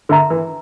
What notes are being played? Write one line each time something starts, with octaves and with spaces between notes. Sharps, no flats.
D3 A#4 E5 A#5
E3